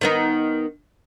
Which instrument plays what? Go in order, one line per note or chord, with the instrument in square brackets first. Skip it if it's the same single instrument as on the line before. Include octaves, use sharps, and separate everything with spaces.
[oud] D#3 B3 D#4